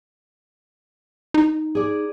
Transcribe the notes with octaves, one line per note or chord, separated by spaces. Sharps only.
D#4
G#4 D5